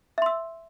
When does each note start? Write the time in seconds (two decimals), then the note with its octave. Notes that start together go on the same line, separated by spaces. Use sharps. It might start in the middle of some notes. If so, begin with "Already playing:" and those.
0.18 E5
0.22 C6
0.26 E6